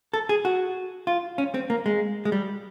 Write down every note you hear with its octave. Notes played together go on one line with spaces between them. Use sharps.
A4
G#4
F#4
F4
C#4
C4
A#3
G#3
G#3
G3